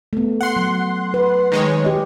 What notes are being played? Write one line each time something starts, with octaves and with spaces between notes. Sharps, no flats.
A3 B3
F#5 C6
F#3
B4
D#3 G#3 C#5
G4 D#5